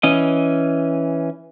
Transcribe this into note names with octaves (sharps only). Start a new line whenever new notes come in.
E3 C#4 D#5